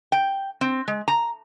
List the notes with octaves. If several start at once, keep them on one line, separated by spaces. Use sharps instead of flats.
G5
C4
G#3
A#5